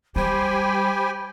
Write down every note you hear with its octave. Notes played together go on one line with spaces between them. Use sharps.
G3 G4 C5 G5 G#5 B5